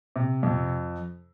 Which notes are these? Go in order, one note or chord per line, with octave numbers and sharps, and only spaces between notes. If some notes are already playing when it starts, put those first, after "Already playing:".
C3
F2